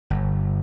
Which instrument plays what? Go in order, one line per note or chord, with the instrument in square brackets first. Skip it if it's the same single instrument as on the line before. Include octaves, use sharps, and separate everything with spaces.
[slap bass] G1